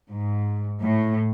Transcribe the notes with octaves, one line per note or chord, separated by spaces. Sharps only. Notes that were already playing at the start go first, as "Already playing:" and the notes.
G#2
A2